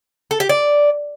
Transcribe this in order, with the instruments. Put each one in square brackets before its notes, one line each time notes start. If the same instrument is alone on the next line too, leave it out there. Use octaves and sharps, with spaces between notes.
[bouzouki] A4
G4
D5